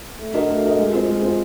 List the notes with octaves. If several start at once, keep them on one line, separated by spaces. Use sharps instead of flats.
A3
D4 F#4 A#4 D#5
A3
D4 F#4 A#4 D#5
G#3
C4 F4
G#3
C4 F4